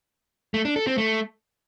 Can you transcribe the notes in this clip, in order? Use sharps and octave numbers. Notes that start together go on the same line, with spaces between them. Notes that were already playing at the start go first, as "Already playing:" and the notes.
A3
D4
A4
C4
A3